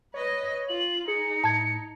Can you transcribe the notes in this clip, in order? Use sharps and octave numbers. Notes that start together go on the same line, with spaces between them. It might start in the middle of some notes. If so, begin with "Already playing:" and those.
B4 C#5 D#5
F4 F#7
D#4 G#4 C#7
A2 A5 G#6